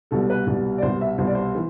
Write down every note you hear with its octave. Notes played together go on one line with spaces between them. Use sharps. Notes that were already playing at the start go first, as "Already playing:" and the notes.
C2 B2 G3 A4
B4
C2 B2 G3
D5
C2 B2 G3 C5
E5
C2 B2 G3 C5
D5
C5
E3